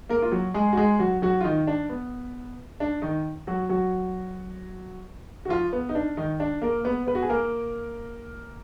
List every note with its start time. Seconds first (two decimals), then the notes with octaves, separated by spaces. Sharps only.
0.09 A#3 A#4
0.22 F4
0.32 F#3 F#4
0.54 G#3 G#4
0.73 F#4
0.77 G#3 G#4
0.99 F#3 F#4
1.22 F#3 F#4
1.41 F4
1.44 D#3 D#4
1.67 D4
1.89 B3
2.80 D4
3.02 D#3 D#4
3.47 F#3 F#4
3.69 F#3 F#4
5.45 F#4
5.49 F3 F4
5.73 B3
5.89 D#4
5.95 D4
6.17 D#3 D#4
6.40 D4
6.62 A#3 A#4
6.84 B3 B4
7.07 B3 B4
7.15 F#4
7.22 G#4
7.29 A#3 A#4